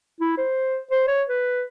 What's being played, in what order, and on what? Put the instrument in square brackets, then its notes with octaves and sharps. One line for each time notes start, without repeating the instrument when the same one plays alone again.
[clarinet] E4
C5
C5
C#5
B4